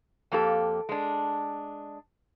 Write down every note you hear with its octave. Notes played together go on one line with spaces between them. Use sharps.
F2 A#3 G4 A4
G#3 D4